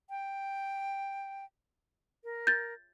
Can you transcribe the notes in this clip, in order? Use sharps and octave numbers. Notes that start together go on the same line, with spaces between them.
G5
A#4
G6 A6